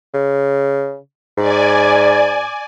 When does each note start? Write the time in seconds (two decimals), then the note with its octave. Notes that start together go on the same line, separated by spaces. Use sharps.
0.14 C#3
1.38 G#2 D5 G#5